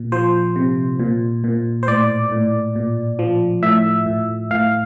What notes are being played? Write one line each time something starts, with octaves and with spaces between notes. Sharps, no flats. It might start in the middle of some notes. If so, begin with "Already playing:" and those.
Already playing: A#2
F3 C5
C3
A#2
A#2
C5
A2 D5
A2
A#2
F3
A2 E5
A2
A2 F5